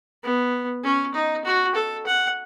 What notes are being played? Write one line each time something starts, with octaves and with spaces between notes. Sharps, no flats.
B3
C#4
D#4
F#4
A4
F#5